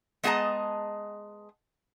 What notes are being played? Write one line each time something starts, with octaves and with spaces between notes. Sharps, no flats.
G#3 B3 G#4 D#5 A5 A#5